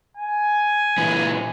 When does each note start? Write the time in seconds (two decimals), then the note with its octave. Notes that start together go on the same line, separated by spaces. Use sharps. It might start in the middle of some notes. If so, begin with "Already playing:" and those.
0.17 G#5
0.98 A#2 E3